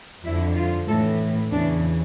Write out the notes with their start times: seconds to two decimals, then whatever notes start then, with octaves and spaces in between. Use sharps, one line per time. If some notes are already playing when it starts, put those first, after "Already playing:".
0.24 F2 D3 E4
0.57 F4
0.87 A2 E3 A4
1.51 E2 C#3 E3 D4